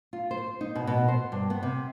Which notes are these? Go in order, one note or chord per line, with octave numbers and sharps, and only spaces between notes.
F4
C5
D#4
B2
B2
C5
G2
B3
C3